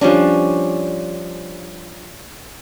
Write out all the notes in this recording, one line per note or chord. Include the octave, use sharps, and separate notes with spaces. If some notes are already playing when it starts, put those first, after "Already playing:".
F3 G3 C#4 D4